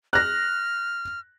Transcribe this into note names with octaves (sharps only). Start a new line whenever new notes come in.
F6 F#6 A#6